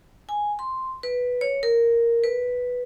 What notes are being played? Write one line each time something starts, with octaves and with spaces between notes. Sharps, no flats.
G#5
C6
B4
C#5
A#4
B4